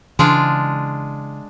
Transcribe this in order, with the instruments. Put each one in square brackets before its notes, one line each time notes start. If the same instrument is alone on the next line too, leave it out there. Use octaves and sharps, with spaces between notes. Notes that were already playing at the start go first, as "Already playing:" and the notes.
[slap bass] C#3 E3 [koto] G#3 D4 F4